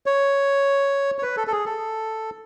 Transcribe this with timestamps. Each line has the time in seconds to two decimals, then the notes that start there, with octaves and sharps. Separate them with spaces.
0.06 C#5
1.19 C#5
1.23 B4
1.37 A4
1.47 A4
1.52 G#4
1.66 A4